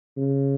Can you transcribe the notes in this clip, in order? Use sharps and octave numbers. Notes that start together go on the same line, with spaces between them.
C#3